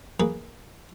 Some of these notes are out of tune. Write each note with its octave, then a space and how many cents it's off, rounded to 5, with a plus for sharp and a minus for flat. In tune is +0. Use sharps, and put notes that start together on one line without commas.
A#3 +0 G#4 +0 B4 -5